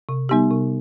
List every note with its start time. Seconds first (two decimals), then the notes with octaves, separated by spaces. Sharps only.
0.09 C3
0.29 G3 B3 D#4 G4
0.51 C3